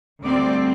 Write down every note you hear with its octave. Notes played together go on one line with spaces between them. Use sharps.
D2 D3 G3 C4 D5